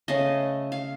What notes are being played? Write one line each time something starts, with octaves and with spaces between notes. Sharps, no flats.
C#3 A3 D#5
F5